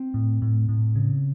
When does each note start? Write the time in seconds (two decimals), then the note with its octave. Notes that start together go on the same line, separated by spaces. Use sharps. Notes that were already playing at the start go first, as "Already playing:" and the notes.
Already playing: C4
0.14 A2
0.42 A2
0.69 A2
0.96 C#3